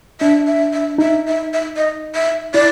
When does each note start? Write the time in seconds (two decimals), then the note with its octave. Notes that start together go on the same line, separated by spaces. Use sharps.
0.21 D4 E5
0.47 E5
0.74 E5
0.98 D#4 E5
1.28 E5
1.54 E5
1.76 D#5
2.15 E5
2.54 E4 D5